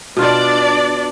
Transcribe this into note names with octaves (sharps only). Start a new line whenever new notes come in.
B2 D4 F4 D5